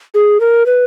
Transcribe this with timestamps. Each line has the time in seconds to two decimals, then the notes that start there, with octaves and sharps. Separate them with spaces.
0.14 G#4
0.40 A#4
0.66 B4